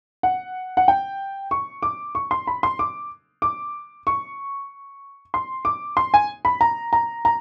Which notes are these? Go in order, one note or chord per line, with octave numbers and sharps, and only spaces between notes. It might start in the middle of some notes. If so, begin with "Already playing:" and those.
F#5
F#5
G5
C#6
D6
C#6
C6
B5
C6
D6
D6
C#6
C6
D6
C6
G#5
B5
A#5
A#5
A#5